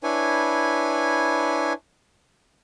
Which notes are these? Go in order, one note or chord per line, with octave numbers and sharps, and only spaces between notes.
D4 E4 B4 C#5 G#5